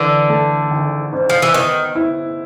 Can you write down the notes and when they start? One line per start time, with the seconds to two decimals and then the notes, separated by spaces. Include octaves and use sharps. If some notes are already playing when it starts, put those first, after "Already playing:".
Already playing: D3 E3
0.29 A3
0.71 G#1
1.13 G#2
1.30 F3
1.42 E3
1.54 D#3 B3
1.95 E4